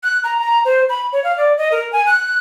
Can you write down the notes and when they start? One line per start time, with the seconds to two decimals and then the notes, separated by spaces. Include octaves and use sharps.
0.03 F#6
0.24 A#5
0.38 A#5
0.65 C5
0.89 B5
1.13 C#5
1.24 F5
1.38 D5
1.58 D#5
1.72 A#4
1.93 G#5
2.07 F#6